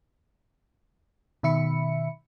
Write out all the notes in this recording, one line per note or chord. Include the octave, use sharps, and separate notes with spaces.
B2 D#3 E5 B5 C#7